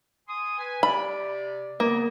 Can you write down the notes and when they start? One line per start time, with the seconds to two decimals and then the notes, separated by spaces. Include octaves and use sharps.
0.28 G#5 C6 D#6
0.58 B4 G#5
0.83 C3 D5 B5
1.80 C#3 A#3 B3